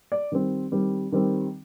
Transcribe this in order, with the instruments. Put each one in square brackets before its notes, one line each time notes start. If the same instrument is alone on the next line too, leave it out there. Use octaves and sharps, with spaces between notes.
[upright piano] D5
D#3 G3 C4
D#3 G3 C4
D#3 G3 C4